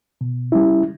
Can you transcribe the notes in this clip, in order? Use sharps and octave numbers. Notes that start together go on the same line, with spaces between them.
B2
G3 C#4 E4